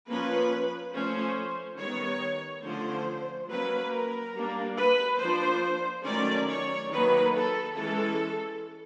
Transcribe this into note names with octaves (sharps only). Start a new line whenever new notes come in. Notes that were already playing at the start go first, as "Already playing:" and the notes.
F3 A#3 C#4 B4
F3 A3 C#4 C5
D#3 G3 B3 C#5
D3 F3 A3 C#4 C5
F#3 A#3 C#4 B4
A#4
G3 A#3 D4
B4
F3 A#3 D4 C5
D#3 F#3 A3 C#4 D5
C#5
D#3 F#3 A#3 B4
A4
E3 G#3 C#4 A4